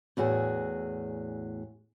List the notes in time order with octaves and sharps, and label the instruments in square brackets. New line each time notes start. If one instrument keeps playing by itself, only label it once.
[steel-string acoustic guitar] E2 A2 F#4 G#4